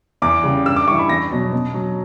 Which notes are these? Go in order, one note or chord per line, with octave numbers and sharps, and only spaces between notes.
E2 D6
C#3 G3
G2 E6
D6
E3 G3 C#6
B5
E2 A#6
B2 F#3
B2
F#3